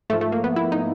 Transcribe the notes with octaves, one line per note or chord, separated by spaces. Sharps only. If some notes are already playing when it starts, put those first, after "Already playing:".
G#2 F3 A3
A3
A#3
B3
E4
D#4